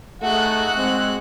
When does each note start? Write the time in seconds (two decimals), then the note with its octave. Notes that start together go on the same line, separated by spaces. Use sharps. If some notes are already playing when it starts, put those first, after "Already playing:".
0.22 A3 D#4 F#4 G#4 F#5 F#6
0.76 G#3 C4